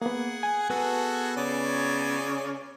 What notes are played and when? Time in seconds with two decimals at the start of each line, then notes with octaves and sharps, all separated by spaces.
0.02 A#3 B3 G#4 F#5
0.43 G#5
0.70 B3 F#4 G#4 A4 B4 F#6
1.37 C#3 C#5 D5